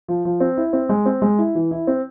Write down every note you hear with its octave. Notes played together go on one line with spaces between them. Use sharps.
F3
F3
C4
E4
C4
G#3
C4
G#3
E4
E3
E4
C4